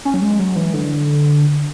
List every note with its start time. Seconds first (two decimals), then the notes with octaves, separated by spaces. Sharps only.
0.05 C#4
0.14 F#3
0.22 G#3
0.39 F#3
0.56 E3
0.74 D3